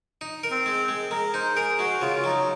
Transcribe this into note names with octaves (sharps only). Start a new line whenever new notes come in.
D#4
A#4
C4
G#3
G#3
G#3 A#4
D#4 C5
G#4 A#4
G#3 F#4
C#3 F4
F4
F#3 D#4